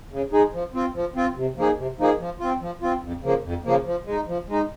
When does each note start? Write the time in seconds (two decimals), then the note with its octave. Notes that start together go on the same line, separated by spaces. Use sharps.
0.12 C#3
0.32 G#3 D#4 G#4
0.54 F3
0.74 C4 F4
0.95 F3
1.15 C4 F4
1.37 C3
1.57 F3 A#3 D#4 G#4
1.78 C3
1.99 F3 A#3 D#4 G#4
2.20 F3
2.40 C4 F4
2.61 F3
2.82 C4 F4
3.03 F2
3.24 C#3 F3 A#3
3.44 F2
3.65 C#3 F3 A#3
3.86 F3
4.06 G#3 D#4
4.28 F3
4.49 G#3 D#4